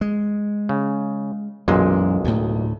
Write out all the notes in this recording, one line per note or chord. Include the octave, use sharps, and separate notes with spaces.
G#3
C#3
B1 F#2 A#2 E3 G#3
D2 A2